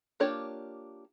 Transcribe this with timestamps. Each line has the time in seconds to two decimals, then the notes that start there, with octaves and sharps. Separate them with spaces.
0.20 A#3 D4 F4 G4 C#5